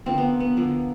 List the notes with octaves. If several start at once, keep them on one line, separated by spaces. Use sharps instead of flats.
D3 F3 A#3 C4
B3
B3
D3 F3 A#3